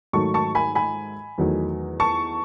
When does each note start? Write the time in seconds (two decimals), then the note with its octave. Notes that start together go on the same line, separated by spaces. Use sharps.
0.13 G#2 D#3 F#3 A3 A5 C#6
0.34 A5 C#6
0.55 G#5 B5
0.75 G#5 B5
1.38 E2 D#3 F#3 A3
2.00 A5 C#6